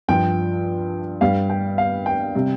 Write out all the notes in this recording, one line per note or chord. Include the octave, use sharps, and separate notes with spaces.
G2 F3 G5
G2 G3 F5
G5
F5
G5
C3 G3